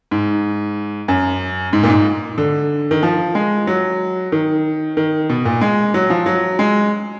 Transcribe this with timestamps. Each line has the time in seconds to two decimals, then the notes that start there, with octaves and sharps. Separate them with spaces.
0.11 G#2
1.08 F#2
1.73 G#2
1.83 A#2
1.89 G#2
2.38 D3
2.91 D#3
3.03 F3
3.35 G#3
3.67 F#3
4.32 D#3
4.97 D#3
5.29 B2
5.45 A#2
5.61 G#3
5.94 F#3
6.10 F3
6.26 F#3
6.59 G#3